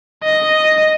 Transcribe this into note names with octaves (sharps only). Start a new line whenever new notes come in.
D#5